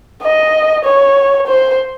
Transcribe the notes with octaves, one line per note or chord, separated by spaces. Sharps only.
D#5
C#5
C5